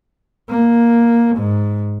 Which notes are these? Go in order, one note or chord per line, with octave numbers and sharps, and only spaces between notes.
A#3
G#2